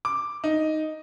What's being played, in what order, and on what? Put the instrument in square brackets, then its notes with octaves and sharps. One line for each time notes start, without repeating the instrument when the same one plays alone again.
[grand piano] D6
D#4